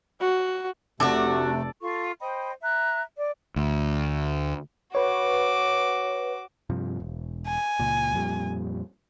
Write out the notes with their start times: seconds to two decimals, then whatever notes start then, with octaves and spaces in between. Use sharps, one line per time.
0.20 F#4
1.00 F1 C3 A3 D4 F#4 A4 D5 A5
1.81 F4 A4 C#6
2.20 C5 D#5 G5 B5
2.61 E5 A#5 F#6
3.17 D5
3.56 D2
4.95 F#4 B4 C#5 D6
6.70 G2 C3 F3
7.00 E1
7.46 G#5
7.80 C#2 A#2
8.13 F2 A#2 G3